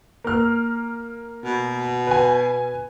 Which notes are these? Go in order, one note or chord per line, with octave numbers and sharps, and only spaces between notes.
A#3 F6
B2
B4 G#5